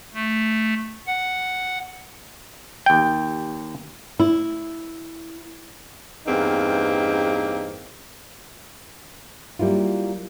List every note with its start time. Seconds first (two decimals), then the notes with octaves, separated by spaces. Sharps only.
0.14 A3
1.07 F#5
2.86 D#2 G5
4.20 E4
6.27 E2 G2 A#3 C4 D#4
9.59 F#3 G3 A#3 E4 F4